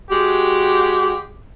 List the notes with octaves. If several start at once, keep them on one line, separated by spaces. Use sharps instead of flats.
G#3 F#4 G4